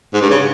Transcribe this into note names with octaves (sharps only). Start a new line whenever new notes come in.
G#2
G2
C#3